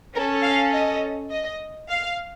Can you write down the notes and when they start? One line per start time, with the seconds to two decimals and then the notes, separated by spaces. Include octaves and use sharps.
0.14 C#4 A4 A#4
0.43 F5
0.73 D#5
1.31 D#5
1.89 F5